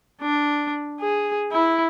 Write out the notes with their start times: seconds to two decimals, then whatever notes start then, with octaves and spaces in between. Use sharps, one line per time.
0.22 D4
1.01 G#4
1.52 E4